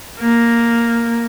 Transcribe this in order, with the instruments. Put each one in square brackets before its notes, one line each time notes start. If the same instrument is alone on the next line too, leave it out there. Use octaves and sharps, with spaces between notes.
[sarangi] A#3